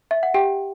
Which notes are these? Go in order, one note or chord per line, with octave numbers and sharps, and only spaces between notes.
E5
F#5
G4 G5